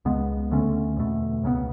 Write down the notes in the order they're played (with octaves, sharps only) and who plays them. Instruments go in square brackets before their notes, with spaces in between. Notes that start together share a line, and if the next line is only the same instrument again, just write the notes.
[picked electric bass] C#2 C#3 G#3 B3
D2 D3 A3 C#4
E2 B2 A3
C#2 C#3 E3 B3